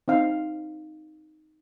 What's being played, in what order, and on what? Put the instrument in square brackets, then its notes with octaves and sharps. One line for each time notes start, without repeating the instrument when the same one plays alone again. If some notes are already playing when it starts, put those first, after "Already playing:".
[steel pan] C4 D#4 F5